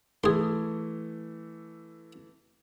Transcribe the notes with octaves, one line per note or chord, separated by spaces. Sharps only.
E3 A3 G#4 C6